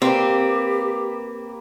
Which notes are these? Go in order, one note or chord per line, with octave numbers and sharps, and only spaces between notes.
A#3 C4 G4 B4